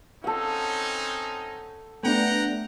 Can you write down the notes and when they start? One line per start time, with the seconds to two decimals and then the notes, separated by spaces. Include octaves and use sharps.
0.24 C4 C#4 D#4 A4 F#5
2.03 A3 B3 D4 F#5 G5 A#5